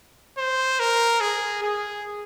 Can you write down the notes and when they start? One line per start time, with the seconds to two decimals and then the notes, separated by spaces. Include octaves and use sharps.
0.38 C5
0.80 A#4
1.21 G#4
1.62 G#4